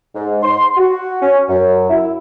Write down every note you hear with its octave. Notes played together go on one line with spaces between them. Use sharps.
G#2
C6
F#4
C#4
F#2
E4